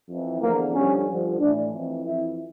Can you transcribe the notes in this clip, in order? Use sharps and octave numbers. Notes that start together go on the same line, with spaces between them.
F2 E3
E2 D3 F3 A#3
G2 D3 F3 C#4
G2 D3 F3
A2 E3 D4
F2 E3
F2 E3 E4